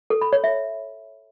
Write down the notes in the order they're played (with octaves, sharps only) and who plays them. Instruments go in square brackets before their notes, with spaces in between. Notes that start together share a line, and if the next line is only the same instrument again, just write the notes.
[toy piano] A4
B5
C#5
E5